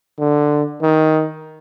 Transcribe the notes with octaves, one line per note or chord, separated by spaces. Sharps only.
D3
D#3